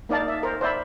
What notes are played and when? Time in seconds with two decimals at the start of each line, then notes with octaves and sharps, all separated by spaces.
0.09 A#3 D#4 D5 F5 A5
0.28 E5
0.43 A#4 C5
0.61 C5 D5 E5 B5